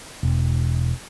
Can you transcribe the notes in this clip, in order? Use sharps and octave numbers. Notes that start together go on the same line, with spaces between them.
E1